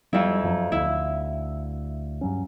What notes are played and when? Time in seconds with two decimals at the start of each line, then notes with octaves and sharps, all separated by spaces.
0.13 F2 F#3 G3 E4
0.43 F#2 F3 F#3
0.72 D2 E4
2.21 G2 F#3 C#4